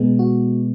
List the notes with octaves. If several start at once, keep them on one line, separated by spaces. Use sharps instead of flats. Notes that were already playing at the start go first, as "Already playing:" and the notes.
Already playing: B2 G#3 B3
F#4